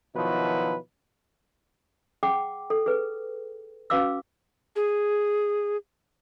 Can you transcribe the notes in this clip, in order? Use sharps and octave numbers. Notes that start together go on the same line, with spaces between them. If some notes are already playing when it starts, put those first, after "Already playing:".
B2 D#3 F3 F#3 E4 B4
G#4 F#5 G5 D6
A4
G#4 A4 B4
C#4 F#4 B4 F5 D6 E6
G#4